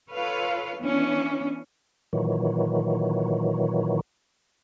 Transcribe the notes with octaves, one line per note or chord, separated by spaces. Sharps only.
F4 A4 B4 C#5 F5
E3 B3 C#4 D4
A#2 D#3 E3 F#3